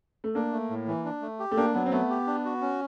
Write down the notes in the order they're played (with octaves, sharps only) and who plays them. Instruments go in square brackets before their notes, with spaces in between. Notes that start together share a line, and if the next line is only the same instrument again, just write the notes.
[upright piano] A3
[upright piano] A#3 [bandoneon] D4
[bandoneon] A3
A2
E3
D4
A3
G4
[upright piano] A3
[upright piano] A#3 [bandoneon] D4
[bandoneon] F#3 [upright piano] B3
[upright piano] C4
[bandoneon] A3 [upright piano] B3
[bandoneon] G4
D4
F#4
C#4